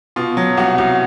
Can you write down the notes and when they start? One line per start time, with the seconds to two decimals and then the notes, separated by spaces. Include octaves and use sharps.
0.16 B2 F4
0.37 F#3
0.57 C2 F#4
0.78 C2